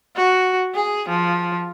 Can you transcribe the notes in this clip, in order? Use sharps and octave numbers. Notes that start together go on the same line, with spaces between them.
F#4
G#4
F3